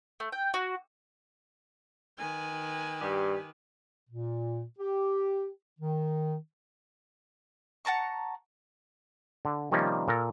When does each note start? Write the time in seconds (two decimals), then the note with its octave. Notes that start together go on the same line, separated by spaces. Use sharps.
0.20 A3
0.32 G5
0.54 F#4
2.18 D#3 B4 G#5
3.01 G2 G4
4.10 A#2
4.79 G4
5.80 D#3
7.85 F#5 A5 A#5 C#6
9.45 D3
9.71 C3 D#3 F3 G3 A#3 C#4
10.08 A#2 A4 A#4